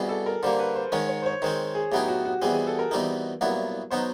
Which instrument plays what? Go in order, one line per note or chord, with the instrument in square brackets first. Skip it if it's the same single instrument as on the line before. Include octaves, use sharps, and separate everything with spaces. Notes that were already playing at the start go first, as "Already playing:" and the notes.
Already playing: [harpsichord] C2 B2 G3 [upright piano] G#4
[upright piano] A4
A#4
[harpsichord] D3 G3 A#3 [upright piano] C5
[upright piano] B4
C5
[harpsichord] G#2 D#3 G#3 C#4 [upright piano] C#5
[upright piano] C#5
C5
C#5
[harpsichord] D#3 G#3 C4 [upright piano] C5
[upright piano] G#4
[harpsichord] A2 F#3 B3 D#4 G#4 [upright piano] G4
[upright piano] F#4
F#4
[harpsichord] E2 B2 G3 C4 [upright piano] G#4
[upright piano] G#4
A4
A#4
[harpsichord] E2 B2 G3 C4 D#4
C2 A#2 F#3 B3 E4
[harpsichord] B2 F#3 B3 D#4 [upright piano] C5